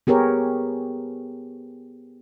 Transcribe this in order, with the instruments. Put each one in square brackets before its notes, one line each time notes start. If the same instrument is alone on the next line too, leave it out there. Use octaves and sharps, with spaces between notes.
[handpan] B3 G4 G#4 A#4 C#5